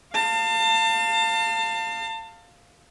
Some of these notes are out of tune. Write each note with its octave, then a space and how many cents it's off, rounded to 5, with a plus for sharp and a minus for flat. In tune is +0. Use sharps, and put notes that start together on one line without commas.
F5 +0 A5 +35